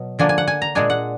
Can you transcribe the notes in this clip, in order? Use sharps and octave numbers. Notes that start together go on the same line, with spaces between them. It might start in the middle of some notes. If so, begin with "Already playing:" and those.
Already playing: B2 F#3
D3 F3 A#3 D4 G#5
G#5
F#5
G#5
A#5
A#2 G#3 D4 G#5
F#5